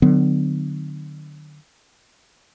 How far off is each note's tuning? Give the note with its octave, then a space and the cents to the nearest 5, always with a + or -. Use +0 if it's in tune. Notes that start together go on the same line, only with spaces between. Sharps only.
D3 +35 F#3 +0 B3 +30